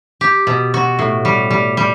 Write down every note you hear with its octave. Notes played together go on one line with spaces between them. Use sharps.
G4
B2
F#4
A2
G3
G3
G3